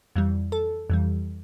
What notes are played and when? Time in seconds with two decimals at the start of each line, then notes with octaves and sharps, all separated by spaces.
0.16 F2 E3 G3
0.52 A4
0.90 F2 E3 G3